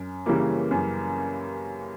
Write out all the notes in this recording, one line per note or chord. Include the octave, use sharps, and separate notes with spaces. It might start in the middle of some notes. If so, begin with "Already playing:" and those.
Already playing: F#2
C#3 E3 G3 A#3
F#2